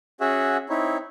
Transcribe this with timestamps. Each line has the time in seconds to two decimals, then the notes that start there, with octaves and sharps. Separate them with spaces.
0.21 C#4 F#4 G#4 E5 F#5
0.69 C4 D#4 E4 C#5